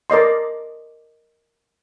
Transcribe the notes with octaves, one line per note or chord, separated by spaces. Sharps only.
A#4 D5 D#5 C6